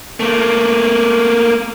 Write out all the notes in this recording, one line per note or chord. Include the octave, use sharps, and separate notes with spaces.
A3 A#3